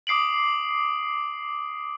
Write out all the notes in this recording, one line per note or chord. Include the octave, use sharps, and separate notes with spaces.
D6 D#6 C7 D7 F#7